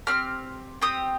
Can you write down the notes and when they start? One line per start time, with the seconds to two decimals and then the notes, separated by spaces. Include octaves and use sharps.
0.07 C4 G4 F6
0.82 C4 G4 D#6